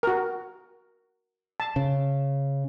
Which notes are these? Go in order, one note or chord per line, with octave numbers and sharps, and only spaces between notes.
F#4 A#4
A5
C#3